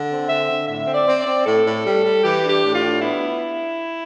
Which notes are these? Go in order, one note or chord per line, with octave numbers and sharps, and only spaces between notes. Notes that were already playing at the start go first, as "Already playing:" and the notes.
Already playing: D3
C4
D3 E5
D3
A2 E5
C4
D5
C4
D5
C4
A2 A4
A2
G3
G3
E3 G4
D4
G4
A2
F4
D4
B3 E4